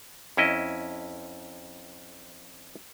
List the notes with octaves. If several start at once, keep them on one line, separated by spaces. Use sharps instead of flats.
F2 C#4 E4 D#5